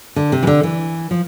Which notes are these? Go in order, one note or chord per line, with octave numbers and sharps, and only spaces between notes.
D3
C3
E3
D3
E3
F3